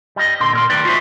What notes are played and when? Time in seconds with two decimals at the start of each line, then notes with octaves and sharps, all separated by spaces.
0.16 G3 D#5
0.40 A#2 D3 C6
0.53 A#2 A#4 C6
0.70 C2 A2 D#3 G4 B4 D5
0.85 F4 F#4 G#4 C5 E5